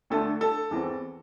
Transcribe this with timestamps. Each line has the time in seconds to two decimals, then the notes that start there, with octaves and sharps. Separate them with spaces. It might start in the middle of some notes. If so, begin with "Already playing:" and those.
0.10 D2 D3 A3 D4 A4
0.41 A4
0.71 E2 E3 C4